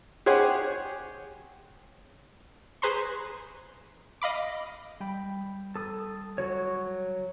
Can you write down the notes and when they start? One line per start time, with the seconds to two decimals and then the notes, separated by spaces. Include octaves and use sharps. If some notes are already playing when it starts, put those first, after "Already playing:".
0.26 G4 G#4 C5 C#5 F#5
2.82 G#4 B4 C5 A#5 C6 C#6
4.22 D#5 F5 B5 D6
5.00 G3 G5 B5
5.75 A4 D#6
6.38 F#3 F#4 C#5